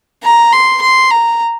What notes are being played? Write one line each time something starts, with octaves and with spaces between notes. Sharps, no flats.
A#5
C6
C6
A#5